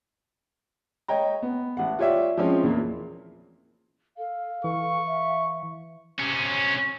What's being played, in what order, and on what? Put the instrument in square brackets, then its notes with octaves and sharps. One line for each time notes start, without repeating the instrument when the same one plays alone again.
[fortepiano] C#5 D#5 G5 A#5
B3
A1 F#5
F4 G4 C#5 D5 E5
F3 G#3 C4 C#4
E2 A#2 A#3
[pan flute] A4 [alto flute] F5
[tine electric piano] E3 [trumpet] C#6
[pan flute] E5
[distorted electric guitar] C3 C#4